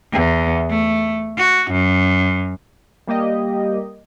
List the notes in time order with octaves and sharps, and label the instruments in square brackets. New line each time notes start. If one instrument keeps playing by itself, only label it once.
[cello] E2
A3
F#4
F#2
[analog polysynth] G3 A#3 G4 D#5